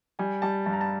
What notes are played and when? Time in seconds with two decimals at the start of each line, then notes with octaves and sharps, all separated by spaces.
0.19 G3 G#5
0.42 G3 A5
0.66 G2 A5
0.73 A#5
0.81 A5